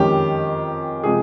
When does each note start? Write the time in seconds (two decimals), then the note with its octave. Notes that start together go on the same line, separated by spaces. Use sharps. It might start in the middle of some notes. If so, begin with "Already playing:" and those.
Already playing: F2 D#3 G#3 C#4 G4
1.03 C3 F3 G#3 G#4